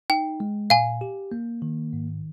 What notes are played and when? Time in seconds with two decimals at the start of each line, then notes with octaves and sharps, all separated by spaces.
0.10 D#4 G5
0.40 G#3
0.70 A#2 F5 G#5
1.01 G4
1.32 A#3
1.62 D#3
1.93 G#2